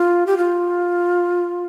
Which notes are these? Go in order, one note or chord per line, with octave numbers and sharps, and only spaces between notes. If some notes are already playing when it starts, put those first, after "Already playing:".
Already playing: F4
G4
F4